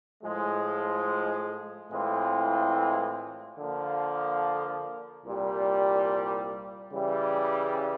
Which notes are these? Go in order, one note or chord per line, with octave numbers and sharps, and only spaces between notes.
A2 F3 G#3
A2 E3 G#3 C4 F4
D3 F3 A#3
C2 A#2 G3
C#3 E3 G3